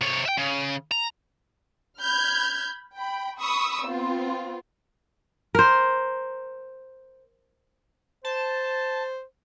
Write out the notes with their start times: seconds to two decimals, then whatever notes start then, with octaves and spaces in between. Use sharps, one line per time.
0.01 C3 C#5
0.25 E5 G5
0.38 C#3
0.92 A#5
2.00 B5 F6 G6 G#6
2.94 G5 B5
3.38 B5 C#6 D#6 E6
3.85 B3 C4 F4
5.55 A#4 C5
8.25 C5 A5